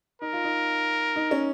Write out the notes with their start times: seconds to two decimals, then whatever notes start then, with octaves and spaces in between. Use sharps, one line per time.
0.22 D#4 A#4
0.33 F4
0.44 D#4
1.16 D#4
1.31 C#4